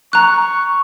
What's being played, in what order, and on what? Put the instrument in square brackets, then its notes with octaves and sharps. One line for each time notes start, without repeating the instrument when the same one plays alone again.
[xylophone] A#5 F#6 [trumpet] C#6